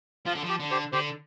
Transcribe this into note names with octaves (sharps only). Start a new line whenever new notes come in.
F3 F4
D3
F3 G4
D3
G4 C5
D3 G4 C5